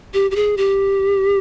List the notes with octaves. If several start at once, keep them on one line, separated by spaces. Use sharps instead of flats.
G4
G4
G#4
G4